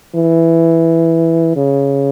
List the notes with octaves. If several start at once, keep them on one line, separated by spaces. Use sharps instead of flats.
E3
C#3